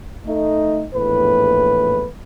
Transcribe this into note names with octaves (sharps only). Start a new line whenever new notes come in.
A3 D#4
A#1 E2 A2 B4